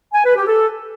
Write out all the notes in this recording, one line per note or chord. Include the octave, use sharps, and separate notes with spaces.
G#5
B4
G4
A4